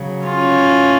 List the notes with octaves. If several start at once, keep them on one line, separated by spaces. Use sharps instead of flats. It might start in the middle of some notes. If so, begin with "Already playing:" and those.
Already playing: C#3 F#3
C#4 F4
A2